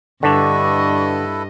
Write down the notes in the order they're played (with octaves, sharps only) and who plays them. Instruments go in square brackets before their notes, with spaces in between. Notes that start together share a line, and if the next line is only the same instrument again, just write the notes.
[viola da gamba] G2 D#5 [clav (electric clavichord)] D3 D4 [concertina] E4 A4 B4 [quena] C#6